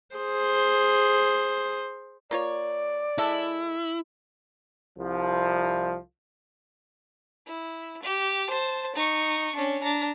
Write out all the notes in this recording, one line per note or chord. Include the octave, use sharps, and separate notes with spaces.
G#4 C5
A#3 F4 C#5 D5
G#3 E4 A4
C2 F3
E4
G4
C5 A5
D#4 C#6
C#4 D4
D4 A#5